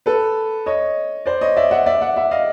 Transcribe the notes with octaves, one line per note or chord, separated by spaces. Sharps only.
A4 B4
C#5 D#5
C5 D5
C#5 D#5
D5 E5
E5 F#5
D5 E5
E5 F#5
E5 F#5
D#5 F5